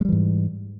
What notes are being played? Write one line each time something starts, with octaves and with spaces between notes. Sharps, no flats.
G#2 E3 G3 G#3